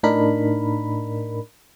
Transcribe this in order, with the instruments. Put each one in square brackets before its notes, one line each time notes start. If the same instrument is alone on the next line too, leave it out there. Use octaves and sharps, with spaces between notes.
[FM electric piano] A2 D4 D#4 A#4 B5